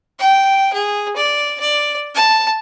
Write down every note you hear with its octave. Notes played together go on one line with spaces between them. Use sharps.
G5
G#4
D5
D5
A5